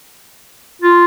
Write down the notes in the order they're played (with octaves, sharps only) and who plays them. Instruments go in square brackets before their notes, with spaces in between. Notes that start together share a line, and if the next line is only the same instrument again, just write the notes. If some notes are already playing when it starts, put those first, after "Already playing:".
[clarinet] F4